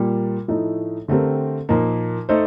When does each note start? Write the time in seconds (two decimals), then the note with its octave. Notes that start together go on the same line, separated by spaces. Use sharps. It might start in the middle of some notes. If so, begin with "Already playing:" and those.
Already playing: A#2 G3 A#3
0.48 A2 F3 A3 D#4
1.08 D3 A3 C4 G4 A#4
1.69 A#2 F3 A#3 D#4
2.29 A3 D#4 A4 C5